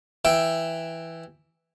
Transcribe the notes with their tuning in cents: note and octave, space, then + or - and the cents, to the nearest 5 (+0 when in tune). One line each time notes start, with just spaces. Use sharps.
E3 +0 E5 +0 G5 +0